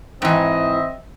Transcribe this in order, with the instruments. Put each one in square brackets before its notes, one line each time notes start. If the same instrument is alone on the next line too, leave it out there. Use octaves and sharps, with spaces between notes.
[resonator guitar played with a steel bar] G#2 E3 [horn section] C4 D#5 E5